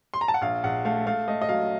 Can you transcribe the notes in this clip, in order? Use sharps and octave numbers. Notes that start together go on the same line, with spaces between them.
C6
A#5
A5
F#5
A#1 F5
A#1 F#5
A3 F5
A3 F5
A3 D#5
D#5
F#3 F5